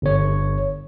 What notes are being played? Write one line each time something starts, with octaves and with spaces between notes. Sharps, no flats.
G1 C#5